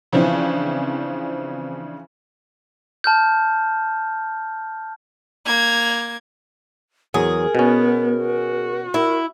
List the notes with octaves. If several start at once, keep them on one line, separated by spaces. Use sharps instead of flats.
C#3 E3 F3 C4 D4
A5 F6 G6
A#3 G#6
E2 F#3 G#4 A#4
B2 B3 C#4
F#4
E4 A#4